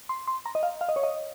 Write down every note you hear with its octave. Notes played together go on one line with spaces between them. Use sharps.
C6
C6
A#5
D#5
F5
F5
D#5
C#5
D#5